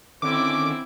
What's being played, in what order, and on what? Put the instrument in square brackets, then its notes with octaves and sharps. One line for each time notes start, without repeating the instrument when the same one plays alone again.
[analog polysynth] D3 D#3 C#4 [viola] C4 E4 [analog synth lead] D6